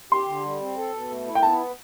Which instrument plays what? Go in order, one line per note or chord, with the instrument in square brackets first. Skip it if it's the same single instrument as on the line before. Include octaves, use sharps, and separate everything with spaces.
[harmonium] G4 [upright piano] C6
[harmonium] D3
G3
C4
A4
B2
A3
E4
[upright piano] G5
[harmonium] B3 [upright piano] A5